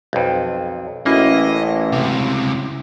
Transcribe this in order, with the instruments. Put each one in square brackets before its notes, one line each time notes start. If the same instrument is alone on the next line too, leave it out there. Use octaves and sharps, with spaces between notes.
[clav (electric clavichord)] B1 F2
[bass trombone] A1 [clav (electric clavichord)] A#3 [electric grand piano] C#4 E4 F#4 [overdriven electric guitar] D#5
[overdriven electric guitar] C#2 C3